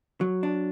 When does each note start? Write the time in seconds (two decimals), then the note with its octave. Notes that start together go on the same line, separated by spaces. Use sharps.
0.21 F#3
0.43 D4